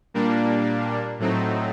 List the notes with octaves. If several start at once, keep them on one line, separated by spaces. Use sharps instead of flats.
A#2 G3 A#3 D4
A2 F#3 A3 C4 D#4